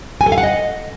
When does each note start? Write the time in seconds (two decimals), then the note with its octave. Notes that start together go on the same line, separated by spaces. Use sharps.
0.21 G#5
0.26 A4
0.32 F5
0.38 F#5
0.43 D#5